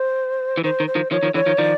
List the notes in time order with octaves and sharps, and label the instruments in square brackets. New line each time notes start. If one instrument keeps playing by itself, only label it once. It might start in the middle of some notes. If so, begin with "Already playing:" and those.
Already playing: [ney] C5
[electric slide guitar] E3
[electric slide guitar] D#3 [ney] C5
[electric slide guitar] D#3
[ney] C5
[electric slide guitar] D#3 F3
[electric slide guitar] D#3 F3 [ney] C#5
[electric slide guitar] D#3 F3
[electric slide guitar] D3 E3 [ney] C#5
[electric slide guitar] D#3 F3
[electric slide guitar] D#3 F3 [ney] D5